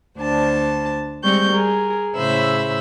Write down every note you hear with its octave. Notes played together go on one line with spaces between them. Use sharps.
D2 D4 C5 A5
G3 G#3 C4 C#6 G6
G#4 A#4
A2 C#3 C5 E5 B5 E6